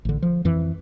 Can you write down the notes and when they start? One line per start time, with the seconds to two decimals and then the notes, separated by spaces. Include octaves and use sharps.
0.05 A1 D3
0.22 F3
0.45 F2 E3